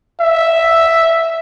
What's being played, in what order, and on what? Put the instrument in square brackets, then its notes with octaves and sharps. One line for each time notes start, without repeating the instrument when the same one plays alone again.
[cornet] E5